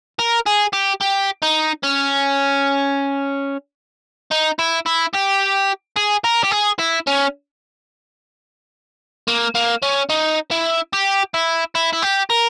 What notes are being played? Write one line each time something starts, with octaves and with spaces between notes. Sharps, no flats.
A#4
G#4
G4
G4
D#4
C#4
D#4
E4
E4
G4
G#4
A#4
G4
G#4
E4
C#4
A#3
A#3
C#4
D#4
E4
G4
E4
E4
E4
G4
A#4